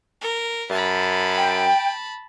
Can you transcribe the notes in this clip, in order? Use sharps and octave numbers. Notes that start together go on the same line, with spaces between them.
A#4
F#2 A5 B5
G5